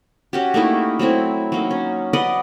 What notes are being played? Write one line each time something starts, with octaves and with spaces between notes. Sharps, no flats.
C#4 F#4 G4
A3 A#3 D#4 E4
F#3 A3 C4 E4
F#3 A#3 D#4
C#4
B4 D5 D#5 F#5